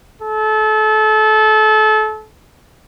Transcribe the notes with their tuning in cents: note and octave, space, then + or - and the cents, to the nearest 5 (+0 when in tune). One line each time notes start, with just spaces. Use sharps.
A4 -30